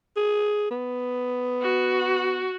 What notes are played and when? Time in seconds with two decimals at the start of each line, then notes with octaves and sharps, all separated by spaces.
0.16 G#4
0.71 B3
1.62 F#4